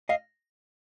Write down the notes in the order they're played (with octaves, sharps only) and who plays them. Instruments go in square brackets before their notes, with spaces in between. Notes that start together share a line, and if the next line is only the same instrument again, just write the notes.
[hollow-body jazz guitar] D#5 F5